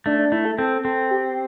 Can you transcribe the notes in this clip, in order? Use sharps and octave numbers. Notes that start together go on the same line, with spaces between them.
A3 D4
D4
A3 E4
A4
C4 A4
C4 A4
G4